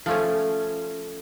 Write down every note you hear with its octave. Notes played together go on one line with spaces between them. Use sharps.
F3 A3 C#4